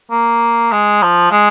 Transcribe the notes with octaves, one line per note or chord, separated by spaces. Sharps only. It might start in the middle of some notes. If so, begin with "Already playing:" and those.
A#3
G#3
F3
G#3